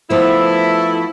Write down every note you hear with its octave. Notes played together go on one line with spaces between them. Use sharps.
F3 A3 B3 E4